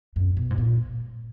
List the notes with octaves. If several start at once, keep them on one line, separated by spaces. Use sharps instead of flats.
F#2
B2
G#2
A#2